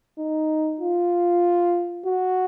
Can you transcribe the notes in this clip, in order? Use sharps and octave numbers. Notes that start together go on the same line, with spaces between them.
D#4
F4
F#4